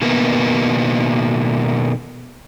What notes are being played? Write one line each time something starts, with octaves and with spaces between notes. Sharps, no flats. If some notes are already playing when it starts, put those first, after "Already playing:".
B2 D#3 A#3 B3